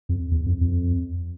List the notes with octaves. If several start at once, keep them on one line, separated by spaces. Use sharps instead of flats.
F2
E2
F2
F2